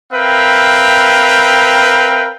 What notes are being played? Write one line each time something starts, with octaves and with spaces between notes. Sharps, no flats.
C4 A#4 B4 E5 F5 G5